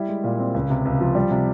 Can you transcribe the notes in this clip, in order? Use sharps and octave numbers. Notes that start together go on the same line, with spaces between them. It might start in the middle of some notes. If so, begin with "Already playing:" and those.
Already playing: G3 E4
G#3
A#2
C4
C#2
C3
C#2
F3
G3
C3